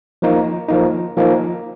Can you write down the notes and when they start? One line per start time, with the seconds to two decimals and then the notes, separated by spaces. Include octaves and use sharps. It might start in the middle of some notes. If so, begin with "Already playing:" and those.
0.22 F3 A#3 D#4
0.68 F3 A#3 D#4
1.17 F3 A#3 D#4